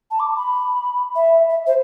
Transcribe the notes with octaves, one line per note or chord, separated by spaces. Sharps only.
A5
D6
B5
E5
E5
C5